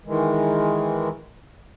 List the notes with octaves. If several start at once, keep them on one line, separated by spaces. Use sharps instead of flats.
D#3 E3 G#3